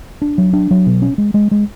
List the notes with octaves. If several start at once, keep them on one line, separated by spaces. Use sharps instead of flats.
D4
F#3
D4
F#3
B2
C#4
G#3
G#3
G#3